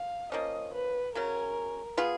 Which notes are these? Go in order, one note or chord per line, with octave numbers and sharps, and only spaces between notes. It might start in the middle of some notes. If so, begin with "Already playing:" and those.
Already playing: F5
F3 A#3 C#4 D#5
B4
C#3 F#3 C#4 A#4
B3 F4 G#4